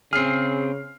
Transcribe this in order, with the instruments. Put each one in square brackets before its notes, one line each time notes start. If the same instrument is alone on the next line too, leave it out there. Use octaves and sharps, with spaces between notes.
[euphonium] C#3 [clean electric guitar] C4 G#4 [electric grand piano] F6 C7